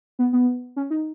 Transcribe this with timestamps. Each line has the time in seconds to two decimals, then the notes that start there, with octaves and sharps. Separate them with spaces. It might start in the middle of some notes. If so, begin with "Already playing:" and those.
0.19 B3
0.33 B3
0.76 C#4
0.90 D#4